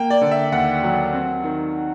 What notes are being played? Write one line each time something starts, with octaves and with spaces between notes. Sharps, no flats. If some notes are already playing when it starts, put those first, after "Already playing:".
Already playing: A#3 G5
D5
D3
E5
D#2 F#5
F#3
C4
D#3